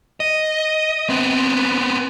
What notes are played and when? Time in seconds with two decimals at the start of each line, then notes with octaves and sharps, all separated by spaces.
0.20 D#5
1.09 B3 C4